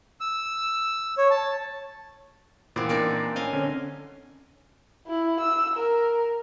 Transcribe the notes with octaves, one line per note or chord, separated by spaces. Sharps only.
E6
C#5
A5
A#2 E3 B3 C4
A#3 D4 D#4
C4 C#4 D#5 F5 G#5
D3 C#4
E4
E6
A#4